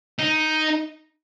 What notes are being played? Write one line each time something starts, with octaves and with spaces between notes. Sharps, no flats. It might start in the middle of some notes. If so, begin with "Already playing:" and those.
D#4